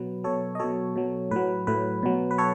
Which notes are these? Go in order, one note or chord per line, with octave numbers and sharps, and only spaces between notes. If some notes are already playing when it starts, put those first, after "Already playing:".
Already playing: B2 F#3 B4
B2 F#3 A4 C#5
D#5
B2 F#3 A4 C#5
B2 F#3
A2 F#3 B4
A2 F#3 B4
B2 F#3
B4
A4 C#5